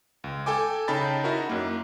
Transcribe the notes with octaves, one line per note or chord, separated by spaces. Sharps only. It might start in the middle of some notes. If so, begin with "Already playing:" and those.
C#2
A4 G5 G#5 D6
C#3 D#4 G5 A5 B5 A6
D#4 E4 F#4 A#4
F#2 A#3